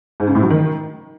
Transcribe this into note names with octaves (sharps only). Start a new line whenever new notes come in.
G#2
C#3
A2
F#3
D#3